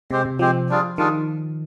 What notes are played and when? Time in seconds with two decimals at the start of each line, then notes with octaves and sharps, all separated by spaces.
0.11 C3 G#3 C4 G4 C5
0.25 C3
0.39 F3 G#3 C4 G4 C5
0.69 G3 D4 F4 G#4
0.98 D#3 G3 D4 F4 G#4